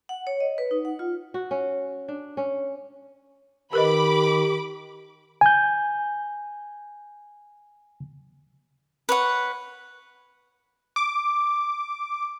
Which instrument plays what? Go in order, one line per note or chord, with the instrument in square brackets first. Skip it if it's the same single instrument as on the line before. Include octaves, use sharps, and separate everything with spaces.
[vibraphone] F#5
C#5
D#5
B4
D#4
F#5
F4
[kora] F#4
C#4
D4
C#4
[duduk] D#3 [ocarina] G4 [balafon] A#4 B4 D#5 [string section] B5 D6
[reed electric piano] G#5 G6
[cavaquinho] B4 C#5 F#5
[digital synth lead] D6